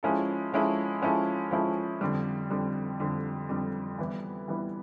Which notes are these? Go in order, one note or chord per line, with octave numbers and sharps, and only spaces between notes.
F3 G#3 C#4 E4 A4
F3 G#3 C#4 E4 A4
F3 G#3 C#4 E4 A4
F3 G#3 C#4 E4 A4
F2 D3 G3
F2 D3 G3
F2 D3 G3
F2 D3 G3
E3 G3 B3 E4
E3 G3 B3 E4